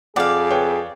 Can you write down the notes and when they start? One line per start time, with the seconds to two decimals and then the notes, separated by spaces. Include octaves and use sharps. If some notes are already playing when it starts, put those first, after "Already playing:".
0.16 F2 G#4 D5 F5 F#5 D6
0.50 B4 C#5 G5